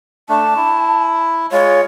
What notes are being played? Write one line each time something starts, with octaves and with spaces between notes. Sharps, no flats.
A3 D4 A5
E4
G#3 F4 C#5